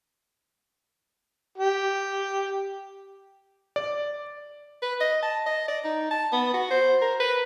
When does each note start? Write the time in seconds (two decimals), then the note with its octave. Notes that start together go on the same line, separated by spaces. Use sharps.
1.58 G4
3.76 D5
4.82 B4
5.01 D#5
5.23 A5
5.46 D#5
5.68 D5
5.85 D#4
6.11 A5
6.33 B3
6.54 F#4
6.71 C5
7.02 A#4
7.20 B4